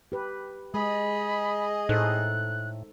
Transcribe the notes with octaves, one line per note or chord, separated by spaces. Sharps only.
G4 B4
G#3 G#4 D#5 B5
A2 D#4 A4 C5 F#6